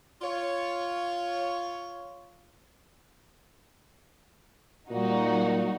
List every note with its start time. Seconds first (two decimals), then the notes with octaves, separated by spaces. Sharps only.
0.22 F4 C#5
4.91 A#2 G3 D#4 F#4